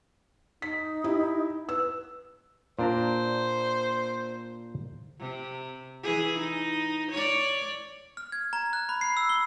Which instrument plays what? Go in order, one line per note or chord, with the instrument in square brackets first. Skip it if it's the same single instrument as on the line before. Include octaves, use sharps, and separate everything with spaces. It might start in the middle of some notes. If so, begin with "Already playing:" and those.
[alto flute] D#4 [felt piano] B6
[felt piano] E4 G4
[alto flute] B4 [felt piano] E6
[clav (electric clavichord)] A#2 D4 A#5 [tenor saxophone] C5
[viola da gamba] C3
E3 G#4
D#4
C#5 D5
[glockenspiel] F6
G#6
A#5
F#6
B5
C7
E6
G7